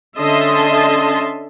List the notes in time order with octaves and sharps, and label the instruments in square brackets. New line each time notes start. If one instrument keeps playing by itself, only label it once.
[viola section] D3 C#4 D#5 E5 A5 C6